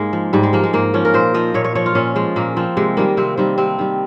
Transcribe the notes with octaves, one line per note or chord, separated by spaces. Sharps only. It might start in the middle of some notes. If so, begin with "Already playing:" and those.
Already playing: G#2 G#3 A#3 G#4 A#4
F3
G#2 G3
G#3
F3 A#3
G#3
G#2 A#3
F3 C#4
A#4
A#2 C5
F3 D#5
A#2 C#5
C#5
F3 C#5
F4
A#2 C#4
F3 G#3
A#2 A#3
F3 C4
C3 G#3
D#3 G3 A#3
C3 C4
D#3 G3 C4
C3 C4
D#3 G3